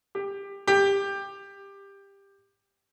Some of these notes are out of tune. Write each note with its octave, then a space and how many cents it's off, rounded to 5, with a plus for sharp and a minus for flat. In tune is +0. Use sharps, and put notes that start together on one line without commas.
G4 +20
G4 +15